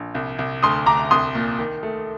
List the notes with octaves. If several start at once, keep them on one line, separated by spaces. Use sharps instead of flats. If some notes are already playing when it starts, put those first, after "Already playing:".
Already playing: A#1
C2
C2
D2 C6 D#6
D2 A#5 D6
C2 C6 D#6
A#2
D#3
A3